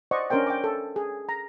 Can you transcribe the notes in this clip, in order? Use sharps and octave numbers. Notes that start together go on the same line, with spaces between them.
C5 D5 D#5 F#5 C#6
C#4 D4 A#4 C5 G5
G5 D6
A4
G#4
A#5